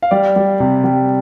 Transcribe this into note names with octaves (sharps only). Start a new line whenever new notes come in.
F5
G3 D5
G3
C3
G3